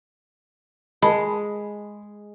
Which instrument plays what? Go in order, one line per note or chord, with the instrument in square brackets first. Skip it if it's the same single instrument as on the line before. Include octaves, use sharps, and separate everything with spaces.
[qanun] G#3 [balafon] D#5 A5 [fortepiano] B5